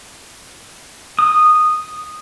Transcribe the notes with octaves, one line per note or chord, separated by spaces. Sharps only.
D#6